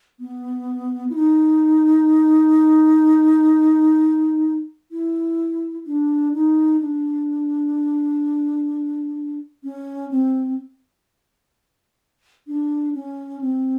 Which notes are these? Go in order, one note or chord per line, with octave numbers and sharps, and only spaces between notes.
B3
E4
D#4
E4
D4
D#4
D4
C#4
C4
D4
C#4
C4